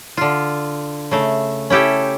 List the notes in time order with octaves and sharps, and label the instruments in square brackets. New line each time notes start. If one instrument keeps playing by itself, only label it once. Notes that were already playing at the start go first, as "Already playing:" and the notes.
[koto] D3 F4
C#3 A3
C#4 E4 G4 A4 G5